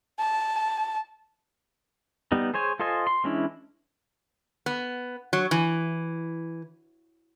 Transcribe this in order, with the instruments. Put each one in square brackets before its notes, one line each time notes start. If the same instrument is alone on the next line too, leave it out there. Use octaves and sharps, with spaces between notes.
[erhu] A5
[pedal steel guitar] G3 B3 D#4
G#4 C5 C#5 G#5
F4 A4 C5 D#5 G#5
C6
E3 G#3 C#4 D4 E4
[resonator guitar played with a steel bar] B3
F#3
E3